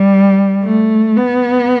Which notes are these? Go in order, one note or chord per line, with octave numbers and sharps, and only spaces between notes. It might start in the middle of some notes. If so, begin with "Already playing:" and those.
Already playing: G3
A3
B3